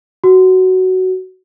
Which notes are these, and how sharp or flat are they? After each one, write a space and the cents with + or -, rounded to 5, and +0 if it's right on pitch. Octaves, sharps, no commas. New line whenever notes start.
F#4 +10